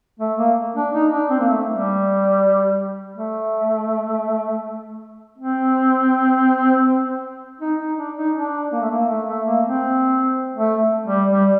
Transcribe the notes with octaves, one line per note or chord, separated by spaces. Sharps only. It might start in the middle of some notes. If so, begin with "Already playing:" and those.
A3
A#3
D4
D#4
D4
C4
A#3
A3
G3
A3
C4
D#4
D#4
D4
D#4
D4
A#3
A3
A#3
A3
A3
A#3
C4
A3
G3
G3